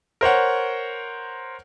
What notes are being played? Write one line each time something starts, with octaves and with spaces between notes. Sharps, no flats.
A#4 C5 C#5 F#5